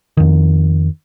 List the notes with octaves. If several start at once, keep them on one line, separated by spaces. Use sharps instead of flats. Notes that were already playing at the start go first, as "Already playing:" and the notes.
F2 D#3